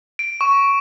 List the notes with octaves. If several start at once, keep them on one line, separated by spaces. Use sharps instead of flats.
D7
C#6